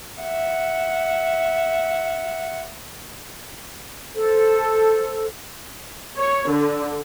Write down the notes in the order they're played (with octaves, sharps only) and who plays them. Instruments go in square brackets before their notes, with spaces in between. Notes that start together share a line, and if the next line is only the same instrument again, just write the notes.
[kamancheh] E5 F#5
[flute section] A4 C5
[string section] C#5
D3